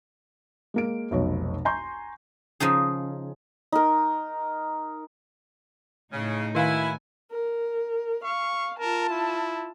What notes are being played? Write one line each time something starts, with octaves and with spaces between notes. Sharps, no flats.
G#3 A#3 D7
F1 B1 C#5
G#5 A#5 C6 C#6 G6
C#3 F3 D#4 G#4
D#4 A#4
A2 C#3 D#4
D#3 A#3 E4 F#4 F5 G#5
A#4
F5 C#6
F4 A#4 A5
E4